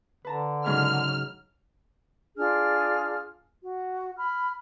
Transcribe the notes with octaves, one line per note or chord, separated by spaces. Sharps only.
D3 B4 A5 A#5
G#2 C#3 F#3 F6
D4 F4 G#4 F6
F#4
B5 F6